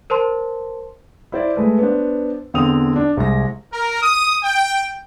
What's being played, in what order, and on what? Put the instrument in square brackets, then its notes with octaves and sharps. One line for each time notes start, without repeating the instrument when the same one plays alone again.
[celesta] A#4 C5 A5 C6
[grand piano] E4 C5 D5
G#3 A3 B4
B3 D4 C5
E2 D3 C4 D#6 F7
D4
C2 G#3 A#6
[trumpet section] A#4
D#6
G5